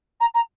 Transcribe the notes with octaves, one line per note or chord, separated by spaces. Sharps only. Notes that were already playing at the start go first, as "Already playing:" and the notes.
A#5
A#5